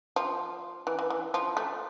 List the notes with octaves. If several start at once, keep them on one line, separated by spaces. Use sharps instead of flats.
F3
E3
E3
E3
F3
A3